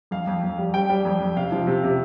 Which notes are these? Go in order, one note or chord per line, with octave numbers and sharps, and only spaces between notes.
F2 F5
F2
F2
G3
G3 G5
G3
F2
F2
C3 F5
F3
C3
C3